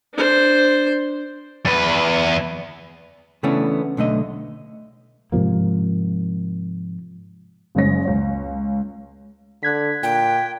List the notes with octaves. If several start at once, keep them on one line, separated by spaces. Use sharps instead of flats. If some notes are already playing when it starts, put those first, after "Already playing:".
D4 C5
E2 B4
C#3 E3 A3 B3 C#4 D4
B1 D3 A3 D#5
G#2 C3 F3 A#3
F#1 C#3 G#3 C#5 A#6
C#2 C#5
D3 F#6 G#6 B6
A#2 G5